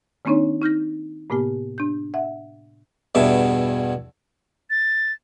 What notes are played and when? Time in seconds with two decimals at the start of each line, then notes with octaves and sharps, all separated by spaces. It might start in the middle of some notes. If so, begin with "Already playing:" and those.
0.25 D#3 A#3 C4 D4 D#4 C#5
0.62 D#4 F6 G6 A#6
1.30 A2 C3 A#3 B3 G4
1.78 D4 G6
2.14 E5 F#5
3.15 E2 G2 B2 E5
4.70 A6